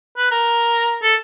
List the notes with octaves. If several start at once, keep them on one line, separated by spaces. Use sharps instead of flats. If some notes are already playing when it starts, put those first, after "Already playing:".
B4
A#4
A4